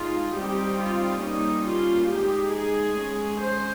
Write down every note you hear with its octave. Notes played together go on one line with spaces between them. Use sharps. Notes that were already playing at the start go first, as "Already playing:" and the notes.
Already playing: G#3 D#4 F4
G3 C4 D#4 G4
F4
G3 A#3 C#4 D#4
F4
G#3 D#4 G4
G#4
G#3 C#4
C5